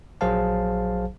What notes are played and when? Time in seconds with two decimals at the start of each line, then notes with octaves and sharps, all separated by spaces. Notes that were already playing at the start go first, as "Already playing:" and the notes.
0.21 A#1 F#3 G#4 C5 F5 A5